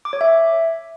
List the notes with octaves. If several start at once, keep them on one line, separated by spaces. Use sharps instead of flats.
D6
C#5
E5